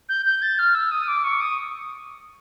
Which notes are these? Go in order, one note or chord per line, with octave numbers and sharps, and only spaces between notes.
G6
G6
A6
F6
E6
D#6
D6
C#6
D#6